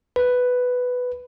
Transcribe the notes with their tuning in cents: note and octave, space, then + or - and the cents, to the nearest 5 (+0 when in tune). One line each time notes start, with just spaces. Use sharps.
B4 +5